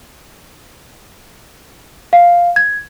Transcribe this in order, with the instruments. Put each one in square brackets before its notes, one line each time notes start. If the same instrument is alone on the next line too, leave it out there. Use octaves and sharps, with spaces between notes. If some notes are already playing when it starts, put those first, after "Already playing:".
[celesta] F5
G#6